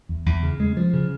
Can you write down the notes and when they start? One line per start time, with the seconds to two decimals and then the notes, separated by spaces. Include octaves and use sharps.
0.09 E2
0.26 E2
0.43 C#3
0.60 G#3
0.77 F3
0.94 C#3